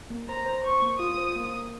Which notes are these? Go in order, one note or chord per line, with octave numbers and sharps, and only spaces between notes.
A#3
C5 A#5
C5
C5 C#6
A#3
F4 D#6
C5
A#3
A#3